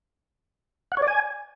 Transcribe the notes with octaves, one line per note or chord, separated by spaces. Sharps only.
F#5
C#5
D5
G#5